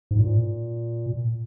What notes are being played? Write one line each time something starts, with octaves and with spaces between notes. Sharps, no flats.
G#2
A#2